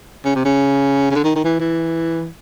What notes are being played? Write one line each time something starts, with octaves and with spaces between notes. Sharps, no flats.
C#3
C3
C#3
C#3
D3
D#3
D#3
E3
E3